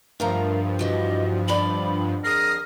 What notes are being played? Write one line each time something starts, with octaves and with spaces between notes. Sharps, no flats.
G2 F3 A3 A#4 F5 A#5
E3 F#4 G4 D#5
F2 D3 D5 B5
G#4 A#4 D#6 A#6 C7